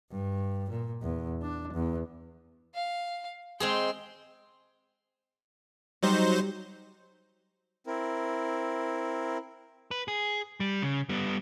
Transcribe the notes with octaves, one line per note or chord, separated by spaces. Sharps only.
G2
A#2
E2
D4
E2
F5
G#3 C4 G#4 G5 C6
F#3 G3 D#4 C5
C4 E4 A#4
B4
G#4
G3
C#3
G3 B3